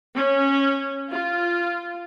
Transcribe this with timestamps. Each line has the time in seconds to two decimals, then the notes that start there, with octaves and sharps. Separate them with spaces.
0.15 C#4
1.11 F4